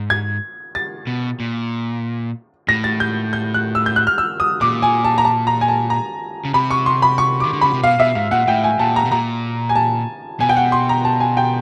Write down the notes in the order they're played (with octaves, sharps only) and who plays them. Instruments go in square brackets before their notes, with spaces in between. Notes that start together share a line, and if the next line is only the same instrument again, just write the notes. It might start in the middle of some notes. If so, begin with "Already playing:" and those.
Already playing: [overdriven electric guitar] G#2
[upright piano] G#6
A6
[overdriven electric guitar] B2
A#2
[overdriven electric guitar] A2 [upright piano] A#6
[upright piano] A6
G6
G6
F#6
E6
G6
F#6
F6
E6
D#6
[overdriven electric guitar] A#2 [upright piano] D6
[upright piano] G#5
A5
A#5
A5
A#5
G#5
A5
A#5
[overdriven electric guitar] C#3
[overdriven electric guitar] C3 [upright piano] B5
[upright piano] C#6
C6
B5
C#6
[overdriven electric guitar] D#3 [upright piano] D6
[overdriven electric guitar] D3
[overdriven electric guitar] C#3 [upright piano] B5
[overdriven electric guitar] C3
[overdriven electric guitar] B2 [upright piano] F5
[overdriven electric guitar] B2 [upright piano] E5
[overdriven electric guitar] G#2 [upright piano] F5
[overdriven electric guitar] A#2 [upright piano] F#5
[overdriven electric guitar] A2 [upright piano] G5
[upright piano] G#5
[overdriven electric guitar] A#2 [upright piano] A5
[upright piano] A#5
[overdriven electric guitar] B2
[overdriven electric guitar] A#2 [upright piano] A#5
[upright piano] G#5
A5
[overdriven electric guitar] B2 [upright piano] G#5
[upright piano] G5
F#5
C6
A#5
A5
G#5
G5